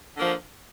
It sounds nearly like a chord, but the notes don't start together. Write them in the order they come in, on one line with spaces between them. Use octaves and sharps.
D3 A#3 F3